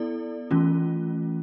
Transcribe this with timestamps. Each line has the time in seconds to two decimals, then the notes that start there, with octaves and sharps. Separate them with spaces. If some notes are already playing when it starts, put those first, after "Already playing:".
Already playing: B3 E4 A4 D5
0.51 E3 A3 C#4 F4